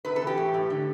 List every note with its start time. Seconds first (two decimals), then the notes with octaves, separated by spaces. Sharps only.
0.05 C3 B4
0.16 A4
0.22 E3
0.27 G4
0.37 A2
0.54 A2
0.70 D3